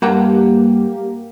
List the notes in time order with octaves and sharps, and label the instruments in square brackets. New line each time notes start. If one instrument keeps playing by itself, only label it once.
[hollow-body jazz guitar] G2 F#5 A#5 [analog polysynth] A#3 G4